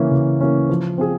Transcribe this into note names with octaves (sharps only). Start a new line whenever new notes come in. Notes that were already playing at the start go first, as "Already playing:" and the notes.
Already playing: C#3 E3 A#3 C#4
C#3
E3 A#3 C#4
F3
C4 F4 G#4